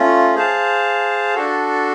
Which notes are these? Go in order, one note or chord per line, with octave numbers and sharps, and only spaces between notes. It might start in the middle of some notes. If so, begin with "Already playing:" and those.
Already playing: A3 C#4 F4
G#4 C5 F5 A5
D4 F#4 A4